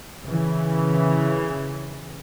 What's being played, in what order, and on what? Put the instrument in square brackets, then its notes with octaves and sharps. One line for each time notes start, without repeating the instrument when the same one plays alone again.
[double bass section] C#3 E3